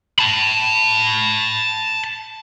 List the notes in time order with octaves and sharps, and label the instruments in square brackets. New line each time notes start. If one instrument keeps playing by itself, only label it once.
[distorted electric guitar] A5 B5